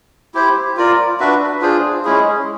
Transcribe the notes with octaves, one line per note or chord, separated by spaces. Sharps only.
E4 G4 C5
F4 A#4 D5
D4 F#4 B4 E5
D4 F4 G#4 C5
G#3 C#4 E4 G#4